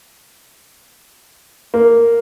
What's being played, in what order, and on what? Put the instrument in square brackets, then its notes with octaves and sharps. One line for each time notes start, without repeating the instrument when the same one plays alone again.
[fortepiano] A#3